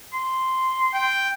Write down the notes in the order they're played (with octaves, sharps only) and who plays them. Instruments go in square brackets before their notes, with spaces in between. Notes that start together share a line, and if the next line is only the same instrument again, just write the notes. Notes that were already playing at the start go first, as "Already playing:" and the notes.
[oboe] C6
[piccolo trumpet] G5